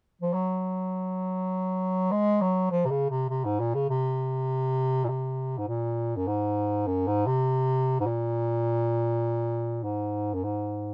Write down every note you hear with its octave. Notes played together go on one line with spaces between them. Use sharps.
F3
F#3
G#3
F#3
F3
C3
C#3
C3
C3
G#2
A#2
C#3
C3
A#2
C3
G#2
A#2
F#2
G#2
F#2
G#2
C3
G#2
A#2
G#2
F#2
G#2